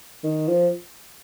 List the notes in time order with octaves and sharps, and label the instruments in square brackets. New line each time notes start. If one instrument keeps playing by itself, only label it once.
[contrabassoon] D#3
F3